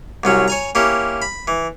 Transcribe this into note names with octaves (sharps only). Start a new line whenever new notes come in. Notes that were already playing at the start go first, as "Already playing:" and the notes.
C2 F#3 C#4
C#5 G#5 A#5
A#3 C#4 E4 G4
B5
E3